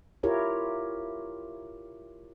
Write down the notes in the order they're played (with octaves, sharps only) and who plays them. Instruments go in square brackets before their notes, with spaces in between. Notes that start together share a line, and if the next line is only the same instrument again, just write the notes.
[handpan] E4 F4 G4 A#4 C#5